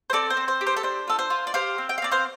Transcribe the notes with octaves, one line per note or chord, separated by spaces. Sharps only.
C5
C4 A4 D5
C5
C4
C5
G4
C5
A4
D4 C5
F4 A4
C5
F4
D5
G4 C5 F5
C4
G5
F5
C4 D5
C5 F5